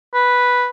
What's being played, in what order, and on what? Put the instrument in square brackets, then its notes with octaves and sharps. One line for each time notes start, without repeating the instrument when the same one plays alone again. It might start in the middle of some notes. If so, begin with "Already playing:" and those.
[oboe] B4